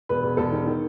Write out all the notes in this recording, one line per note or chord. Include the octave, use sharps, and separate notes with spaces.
E1 B4
E1
E1 A4
D#3
D#3